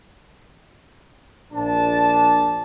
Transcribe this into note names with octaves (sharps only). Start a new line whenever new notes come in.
A#1 D4 A5